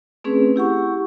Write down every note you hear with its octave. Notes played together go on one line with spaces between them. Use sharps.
A3 C4 C#4 G#4 B4
E4 G4 F#5 C#6